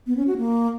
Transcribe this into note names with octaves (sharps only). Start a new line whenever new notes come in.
B3
C#4
F#4
A#3